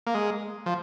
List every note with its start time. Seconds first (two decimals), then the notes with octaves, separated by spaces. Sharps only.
0.07 A#3
0.15 G#3
0.66 F3